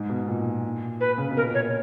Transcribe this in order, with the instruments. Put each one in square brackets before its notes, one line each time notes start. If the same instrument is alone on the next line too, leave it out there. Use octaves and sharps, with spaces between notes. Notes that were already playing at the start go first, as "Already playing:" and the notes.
Already playing: [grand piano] G#2
B2
A#2
[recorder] B4
[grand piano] C#3
B2
[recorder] A#4
[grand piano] A#2
[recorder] C#5